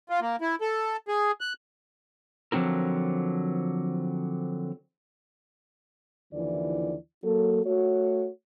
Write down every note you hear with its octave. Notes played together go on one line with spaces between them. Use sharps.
F4
A#3
E4
A4
G#4
F#6
D3 F3 F#3 C4 E4 A#4
D#2 D3 E3 F3 E4 D5
F#3 A#3 A4
A3 F#4 C#5